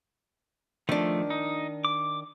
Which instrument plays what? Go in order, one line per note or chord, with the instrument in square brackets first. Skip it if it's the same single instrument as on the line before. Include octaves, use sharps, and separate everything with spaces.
[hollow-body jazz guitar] D#3 D4 [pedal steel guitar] F3 A3
[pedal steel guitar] D#4
D6